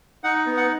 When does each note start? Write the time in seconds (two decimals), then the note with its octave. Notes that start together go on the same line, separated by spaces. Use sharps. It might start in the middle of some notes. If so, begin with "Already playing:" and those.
0.24 D#4 F#5
0.46 B3
0.57 F#5